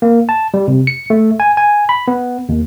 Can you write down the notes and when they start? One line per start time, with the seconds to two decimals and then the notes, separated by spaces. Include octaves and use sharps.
0.02 A#3
0.29 A5
0.54 G3
0.68 C3
0.87 C#7
1.10 A3
1.40 G#5
1.57 G#5
1.89 B5
2.08 B3
2.49 D#2